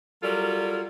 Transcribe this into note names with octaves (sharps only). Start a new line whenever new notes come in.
F#3 G3 F4 A4 A#4